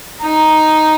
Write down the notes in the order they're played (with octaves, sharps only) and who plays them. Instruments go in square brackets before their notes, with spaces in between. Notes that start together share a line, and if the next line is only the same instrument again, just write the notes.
[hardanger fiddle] D#4